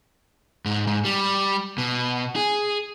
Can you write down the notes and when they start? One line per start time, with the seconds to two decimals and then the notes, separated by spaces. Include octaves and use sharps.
0.66 G#2
0.87 G#2
1.05 G3
1.78 B2
2.36 G#4